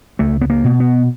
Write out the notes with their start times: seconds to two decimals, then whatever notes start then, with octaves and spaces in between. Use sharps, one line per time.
0.19 C#2 A3
0.41 B3
0.50 A#3
0.64 B2
0.80 B3